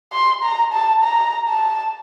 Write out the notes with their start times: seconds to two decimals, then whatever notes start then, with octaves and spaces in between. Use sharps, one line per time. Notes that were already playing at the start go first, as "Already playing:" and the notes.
0.12 C6
0.43 A#5
0.73 A5
1.03 A#5
1.48 A5